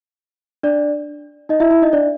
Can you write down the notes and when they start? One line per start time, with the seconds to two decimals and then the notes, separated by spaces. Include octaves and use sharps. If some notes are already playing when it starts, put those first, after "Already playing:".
0.63 D4 D5
1.49 D#4 D#5
1.60 E4 E5
1.71 E4 E5
1.82 D#4 D#5
1.93 D4 D5